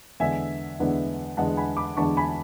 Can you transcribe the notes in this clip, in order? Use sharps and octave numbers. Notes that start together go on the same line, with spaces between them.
E2 D3 G#3 B3 D4 E5 G#5
E2 D3 G#3 B3 D4
E2 D3 G#3 B3 D4 F#5 A5
G#5 B5
B5 D6
E2 D3 G#3 B3 D4 A5 C#6
G#5 B5